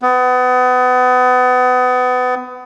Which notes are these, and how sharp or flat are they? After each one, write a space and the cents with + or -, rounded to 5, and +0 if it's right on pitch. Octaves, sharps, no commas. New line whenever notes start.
B3 +30